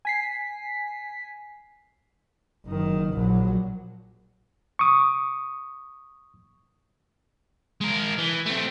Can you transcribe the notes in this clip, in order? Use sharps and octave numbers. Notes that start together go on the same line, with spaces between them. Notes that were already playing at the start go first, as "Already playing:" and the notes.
G#5 B6 C7
F#1 D#3
A#1 F#3
C#6 D#6
G#3 A#4
E3
A3 C4